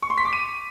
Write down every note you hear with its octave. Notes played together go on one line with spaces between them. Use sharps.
C#6
C6
B6
D6
D#7